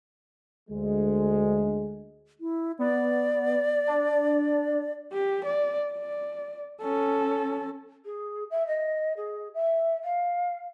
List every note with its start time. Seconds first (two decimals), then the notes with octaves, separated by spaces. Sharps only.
0.70 D2 G#3
2.41 E4
2.79 B3 D5
3.87 D4
5.13 G4
5.45 D5
5.93 D5
6.82 C#4 A4
8.05 G#4
8.50 E5
8.67 D#5
9.17 G#4
9.54 E5
10.04 F5